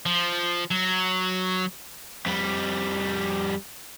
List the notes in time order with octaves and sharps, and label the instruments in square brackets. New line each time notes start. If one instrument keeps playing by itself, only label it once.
[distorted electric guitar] F3
F#3
[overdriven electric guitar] F2 G3